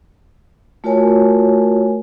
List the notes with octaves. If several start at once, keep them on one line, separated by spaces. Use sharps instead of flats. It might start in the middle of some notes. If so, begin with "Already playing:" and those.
A3 F4 F#4 A#4 C#5 G#5